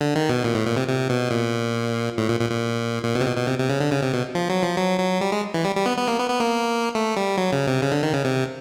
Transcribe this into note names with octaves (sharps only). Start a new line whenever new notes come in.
D3
D#3
B2
A#2
A2
A#2
C3
C3
B2
A#2
A2
A#2
A#2
A#2
A#2
B2
C3
B2
B2
C3
C3
C#3
D3
C#3
C3
B2
F3
F#3
F3
F#3
F#3
G3
G#3
E3
G3
G3
B3
B3
A#3
B3
B3
A#3
A3
G3
F#3
C#3
C3
C#3
D3
D#3
C#3
C3